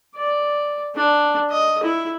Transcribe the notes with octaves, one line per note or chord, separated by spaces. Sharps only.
D5
D4
D#5
E4